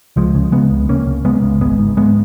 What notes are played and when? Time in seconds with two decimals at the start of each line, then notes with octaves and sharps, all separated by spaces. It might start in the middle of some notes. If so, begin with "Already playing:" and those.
0.16 C#2 F3 G#3
0.35 C#3
0.52 C#3 G#3 B3
0.71 C#2
0.89 C#2 A#3 C#4
1.07 C#3
1.25 C#3 G#3 B3
1.43 C#2
1.60 G#1 G#3 B3
1.79 G#2
1.97 G#2 G#3 B3